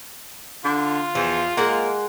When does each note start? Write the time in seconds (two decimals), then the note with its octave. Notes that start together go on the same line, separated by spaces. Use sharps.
0.65 D3 F4
1.15 E2 F3
1.57 G#3 A#3 F#5